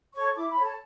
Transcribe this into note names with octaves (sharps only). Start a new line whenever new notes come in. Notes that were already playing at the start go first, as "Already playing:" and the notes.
A4 C#5 C#6
E4 D6
B5
A4 C#5
A5